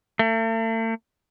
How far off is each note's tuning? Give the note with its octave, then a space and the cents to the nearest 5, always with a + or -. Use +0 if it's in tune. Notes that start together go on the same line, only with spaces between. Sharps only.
A3 +40